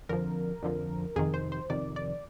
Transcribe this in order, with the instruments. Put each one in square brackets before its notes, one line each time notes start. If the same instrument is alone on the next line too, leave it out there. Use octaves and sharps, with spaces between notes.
[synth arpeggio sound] F2 D3 F3 A#4
F2 D3 F3
F2 C3 D#3 G#4
C5
C5
F2 C3 D#3 D5
D5